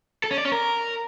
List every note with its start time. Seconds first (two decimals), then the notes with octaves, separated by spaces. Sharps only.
0.24 A4
0.31 C#4
0.38 D5
0.45 C#4
0.52 A#4